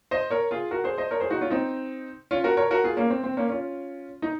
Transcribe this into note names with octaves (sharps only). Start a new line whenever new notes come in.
C5 D#5
A#4 C#5
F4 G#4
F#4 A#4
G#4 C5
C5 D#5
A#4 C#5
G#4 C5
D#4 F#4
C#4 F4
C4 D#4
C#4 F4
F#4 A#4
A#4 C#5
F#4 A#4
F4 G#4
A#3 C#4
C4
C4
A#3 C#4
C#4 F4
D#4